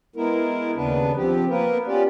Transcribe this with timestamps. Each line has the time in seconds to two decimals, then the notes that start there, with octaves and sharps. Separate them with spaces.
0.16 G#3 B3 E4 A#4
0.75 D#2 C#3 B3 D4 B4
1.16 F3 C4 G4
1.49 A#3 B3 A#4 B4
1.87 B3 C#4 F4 G4 D5